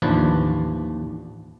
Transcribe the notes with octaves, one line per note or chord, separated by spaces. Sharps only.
A1 D#2 F3 D4 B4